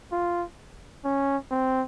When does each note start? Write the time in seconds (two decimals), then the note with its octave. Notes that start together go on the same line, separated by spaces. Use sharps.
0.12 F4
1.05 C#4
1.51 C4